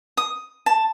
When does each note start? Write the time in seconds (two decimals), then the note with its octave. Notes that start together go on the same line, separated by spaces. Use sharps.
0.17 D#6
0.66 A5